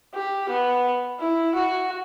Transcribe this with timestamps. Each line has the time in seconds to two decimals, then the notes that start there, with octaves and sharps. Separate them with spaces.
0.14 G4
0.49 B3
1.20 E4
1.55 F#4